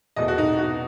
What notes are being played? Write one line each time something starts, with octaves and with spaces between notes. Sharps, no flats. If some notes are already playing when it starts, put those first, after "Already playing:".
E2 B2 A3 D#5
F#4
D#4
F#4